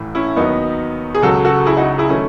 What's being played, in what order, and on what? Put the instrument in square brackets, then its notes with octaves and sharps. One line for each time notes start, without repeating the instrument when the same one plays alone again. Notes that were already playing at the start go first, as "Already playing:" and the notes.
Already playing: [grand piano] A1 A2 E3
C#4 E4
D#2 D#3 F#3 B3 D#4
G#4
C#2 C#3 F#3 F#4 A4
F#4 A4
E4 G#4
D#4 F#4
E4 G#4
D#3 F#3 A3 C#4